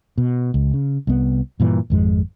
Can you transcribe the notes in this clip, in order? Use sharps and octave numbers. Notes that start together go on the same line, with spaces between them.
B2
C#2
C#3
C2 B3
G2 A#2 E3
G#1 F2 G#3